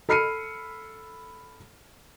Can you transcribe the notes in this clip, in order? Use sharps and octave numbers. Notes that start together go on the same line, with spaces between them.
A4 B5 F6 C7 C#7 D#7